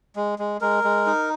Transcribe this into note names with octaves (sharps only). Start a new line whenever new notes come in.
G#3
G#3
G#3 A#4
G#3
D#4